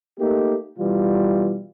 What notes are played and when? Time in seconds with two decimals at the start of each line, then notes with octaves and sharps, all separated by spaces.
0.20 A3 A#3 D#4 G4
0.78 B2 E3 G3 F4